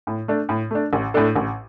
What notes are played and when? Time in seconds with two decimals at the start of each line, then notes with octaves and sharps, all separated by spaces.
0.07 A2
0.28 A3 D4
0.49 A2
0.71 A3 D4
0.93 A1
1.14 A2 A3 D4 A4
1.36 A1